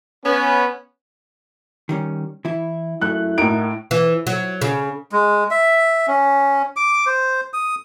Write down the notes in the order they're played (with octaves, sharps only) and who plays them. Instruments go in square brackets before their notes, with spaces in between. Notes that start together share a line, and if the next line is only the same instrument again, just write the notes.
[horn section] B3 C#4
[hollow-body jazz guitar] D#3 G3 C#4
E3 E4
[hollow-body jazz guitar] F#2 A3 [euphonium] E4 [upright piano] F#6
[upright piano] A2 D7 [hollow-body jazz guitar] D#4 F#4 A#4
[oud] E3
F#3
C#3
[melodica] G#3
E5
C#4
D6
C5
D#6